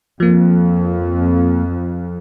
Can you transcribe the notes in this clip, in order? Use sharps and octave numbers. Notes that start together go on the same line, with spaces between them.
F2 F3 A#3